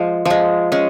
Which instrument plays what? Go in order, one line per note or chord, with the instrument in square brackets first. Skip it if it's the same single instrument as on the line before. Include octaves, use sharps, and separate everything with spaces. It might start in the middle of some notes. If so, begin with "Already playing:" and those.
Already playing: [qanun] F3 G#3
F3 G#3
G#3 C#4